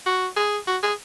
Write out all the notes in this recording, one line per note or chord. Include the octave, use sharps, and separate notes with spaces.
F#4
G#4
F#4
G#4